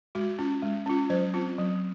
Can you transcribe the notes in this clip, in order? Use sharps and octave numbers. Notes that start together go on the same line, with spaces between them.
G#3 F#4
C#4 F4
G#3
C#4 F4
F#3 C5
C4 F4
F#3